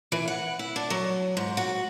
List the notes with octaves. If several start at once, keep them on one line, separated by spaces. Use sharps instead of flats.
E3
F#5
E4
D4
F#3
G#2
F#4